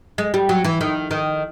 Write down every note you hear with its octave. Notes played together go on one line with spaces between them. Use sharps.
G#3
G3
F#3
E3
D#3
D#3